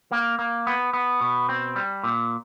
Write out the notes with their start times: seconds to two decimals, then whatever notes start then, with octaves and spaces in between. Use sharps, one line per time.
0.11 A#3
0.39 A#3
0.67 B3
0.93 B3
1.21 B2
1.49 C4
1.76 G3
2.03 A#2